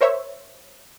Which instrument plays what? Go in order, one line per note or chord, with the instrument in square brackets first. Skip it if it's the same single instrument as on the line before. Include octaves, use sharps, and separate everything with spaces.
[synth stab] A#4 C5 C#5 E5